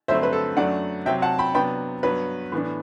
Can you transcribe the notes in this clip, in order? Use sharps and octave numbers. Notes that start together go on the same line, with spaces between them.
G2 D3 F#3 A3 C4 C5 E5
B4
A4
F#2 F#3 A3 D4 D5 F#5
C3 F#3 C4 E5 G5
F#5 A5
G5 B5
C3 F#3 B3 D4 G5 B5
G2 F#3 B3 B4
A2 E3 B3 D4